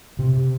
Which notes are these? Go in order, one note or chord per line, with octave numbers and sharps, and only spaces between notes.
C3